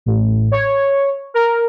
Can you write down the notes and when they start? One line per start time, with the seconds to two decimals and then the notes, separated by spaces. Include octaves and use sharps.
0.06 A1
0.52 C#5
1.34 A#4